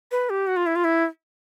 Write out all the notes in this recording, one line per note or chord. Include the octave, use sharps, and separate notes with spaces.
B4
G4
F#4
F4
E4
F4
E4